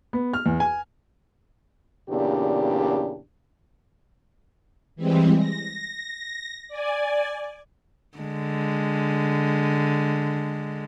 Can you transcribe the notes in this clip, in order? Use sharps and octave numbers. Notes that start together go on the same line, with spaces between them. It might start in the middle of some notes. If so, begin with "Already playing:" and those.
B3
F6
E2
G#5
E2 A#2 C#3 D4 G4
E3 G3 G#3 C4
A#6
D5 G#5
D3 G#3